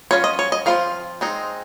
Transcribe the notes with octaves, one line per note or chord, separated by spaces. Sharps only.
F#3 C#4 F4 C#5
D#5
C#5
D#5
F3 C4 F4 F5
G#3 C4 D#4